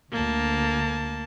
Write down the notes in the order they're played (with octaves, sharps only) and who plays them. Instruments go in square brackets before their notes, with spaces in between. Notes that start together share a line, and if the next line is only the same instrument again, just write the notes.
[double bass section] D2 [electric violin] A#3 A5